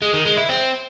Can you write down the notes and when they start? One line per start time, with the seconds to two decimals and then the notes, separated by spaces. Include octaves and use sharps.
0.02 G#3
0.14 D#3
0.26 G#3
0.37 E4
0.49 C4